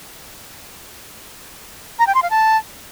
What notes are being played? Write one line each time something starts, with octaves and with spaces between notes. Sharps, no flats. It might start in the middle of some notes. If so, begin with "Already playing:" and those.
A#5
G5
C6
F5
A5